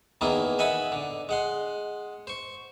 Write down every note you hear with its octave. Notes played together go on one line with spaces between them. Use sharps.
E2 D#3 A#3 B3 E4 G#4
D#5 E5 F#5 G#5 A5 B5
D3
G#3 F#5 C6
C5 C#6